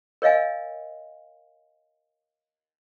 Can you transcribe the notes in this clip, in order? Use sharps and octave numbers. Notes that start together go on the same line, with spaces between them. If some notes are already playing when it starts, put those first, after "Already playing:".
A#4 C#5 D#5 F5 G#5